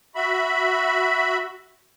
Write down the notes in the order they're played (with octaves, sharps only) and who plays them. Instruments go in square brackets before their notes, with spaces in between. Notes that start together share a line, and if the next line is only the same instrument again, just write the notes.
[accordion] F#4 E5 B5